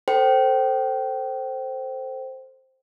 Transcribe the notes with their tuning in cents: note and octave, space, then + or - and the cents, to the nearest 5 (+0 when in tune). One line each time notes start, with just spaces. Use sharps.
A4 +20 C5 +0 G5 -25